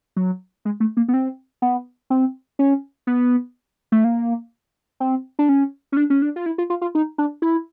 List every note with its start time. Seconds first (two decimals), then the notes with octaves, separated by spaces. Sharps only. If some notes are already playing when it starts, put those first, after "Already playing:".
0.16 F#3
0.65 G#3
0.80 A3
0.97 A#3
1.08 B3
1.14 C4
1.62 B3
2.10 C4
2.59 C#4
3.07 B3
3.92 A3
4.04 A#3
5.00 C4
5.39 D4
5.49 C#4
5.92 C#4
5.97 D4
6.10 C#4
6.22 D4
6.36 F4
6.46 E4
6.58 F4
6.70 F4
6.82 F4
6.95 D#4
7.18 D4
7.42 E4